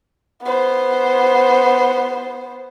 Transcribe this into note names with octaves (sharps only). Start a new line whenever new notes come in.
B3 C5